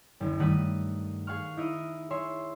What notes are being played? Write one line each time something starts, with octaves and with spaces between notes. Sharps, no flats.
F#1 D2
G2 D#3 A3 F#5 D#6 B6
G#4 F5 F#5 C#6 F6
D#4 E4 D#5 D#6
G#4 C#5 E5 C6